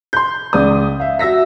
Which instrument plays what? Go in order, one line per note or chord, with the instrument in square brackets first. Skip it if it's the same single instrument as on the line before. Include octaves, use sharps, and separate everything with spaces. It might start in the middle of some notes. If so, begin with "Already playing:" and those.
[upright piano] C6 G6
C#2 C#3 D5 D#6
E5 F5
F#4 E5 E6 A#6 B6